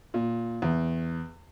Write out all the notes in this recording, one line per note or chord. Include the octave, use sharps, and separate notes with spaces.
A#2
E2